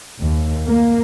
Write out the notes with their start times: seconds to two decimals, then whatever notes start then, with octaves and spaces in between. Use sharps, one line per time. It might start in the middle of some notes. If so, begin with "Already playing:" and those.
0.20 D#2
0.69 A#3